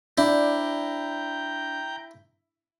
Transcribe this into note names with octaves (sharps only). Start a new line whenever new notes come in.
D4 E4 C5 D5 G5 A#5 G6